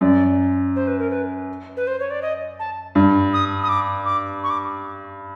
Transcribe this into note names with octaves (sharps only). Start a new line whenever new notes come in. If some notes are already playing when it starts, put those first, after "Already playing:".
F#2 D5
C5
B4
A#4
B4
B4
C5
C#5
D5
D#5
A5
G2
D#6
D#6
D6
D6
C#6
D6